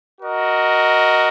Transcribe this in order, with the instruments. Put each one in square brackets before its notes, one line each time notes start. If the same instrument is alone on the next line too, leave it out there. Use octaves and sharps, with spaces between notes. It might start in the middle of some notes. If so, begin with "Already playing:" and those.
[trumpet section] F#4 A#4 D#5